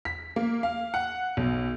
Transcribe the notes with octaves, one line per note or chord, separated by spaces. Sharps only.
B6
A#3
F5
F#5
B1